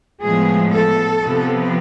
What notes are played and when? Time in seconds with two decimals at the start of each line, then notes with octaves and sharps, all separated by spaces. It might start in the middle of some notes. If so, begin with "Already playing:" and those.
0.21 A2 F3 G#3 B3 G#4
0.72 A4
1.23 C3 F3 B3